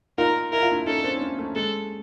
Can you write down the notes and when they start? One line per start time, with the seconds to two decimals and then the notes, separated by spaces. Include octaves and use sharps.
0.18 D#4 F4 A#4
0.52 E4 A#4
0.62 F4
0.71 D4 E4
0.87 C#4 D#4 A4
1.04 C4 D4
1.16 C#4
1.21 C4 D4
1.39 A3
1.55 G#3 A4